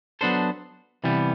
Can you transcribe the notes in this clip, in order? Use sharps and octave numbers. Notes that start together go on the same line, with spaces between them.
F#3 B3 D4 A4 C5
C3 E3 G3 B3